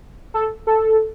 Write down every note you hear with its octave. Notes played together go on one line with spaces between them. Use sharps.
A4
A4